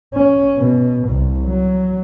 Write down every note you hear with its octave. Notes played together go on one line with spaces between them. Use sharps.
C#4
B2
C2
F#3